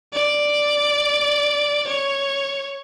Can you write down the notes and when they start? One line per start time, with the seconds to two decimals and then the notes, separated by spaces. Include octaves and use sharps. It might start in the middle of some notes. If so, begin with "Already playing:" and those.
0.13 D5
1.87 C#5